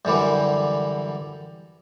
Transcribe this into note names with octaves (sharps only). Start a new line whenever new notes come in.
F#2 D3 E3 G3